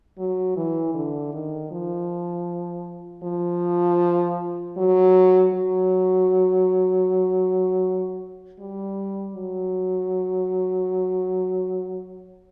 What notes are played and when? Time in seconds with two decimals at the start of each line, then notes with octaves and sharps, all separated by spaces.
0.18 F#3
0.57 E3
0.94 D3
1.33 D#3
1.71 F3
3.24 F3
4.77 F#3
5.53 F#3
8.60 G3
9.35 F#3